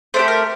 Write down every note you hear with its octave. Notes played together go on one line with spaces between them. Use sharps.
A3 D4 G4 C5
A#4